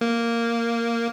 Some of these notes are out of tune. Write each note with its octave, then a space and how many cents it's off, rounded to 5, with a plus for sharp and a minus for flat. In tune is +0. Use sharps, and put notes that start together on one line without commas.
A#3 -5